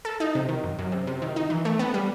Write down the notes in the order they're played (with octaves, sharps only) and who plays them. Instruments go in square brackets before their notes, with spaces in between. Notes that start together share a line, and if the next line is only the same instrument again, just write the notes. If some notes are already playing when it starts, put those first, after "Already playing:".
[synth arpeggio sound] A4
D#4
C3
D#3
F#2
F#2
C3
C3
D#3
D#4
E3
A3
B3
G3